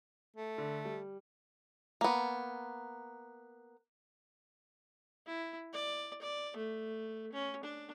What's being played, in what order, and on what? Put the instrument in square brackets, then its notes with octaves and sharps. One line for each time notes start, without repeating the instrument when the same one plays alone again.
[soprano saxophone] A3
[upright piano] D3
G3
[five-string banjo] A#3 B3
[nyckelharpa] E4
D5
D5
A3
C#4
D4